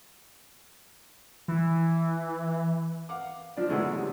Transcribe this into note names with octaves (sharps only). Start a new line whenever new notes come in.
E3
F5 F#5 D6
F3 D4 D5
B2 D3 E3 F#3 G#3 A3
C3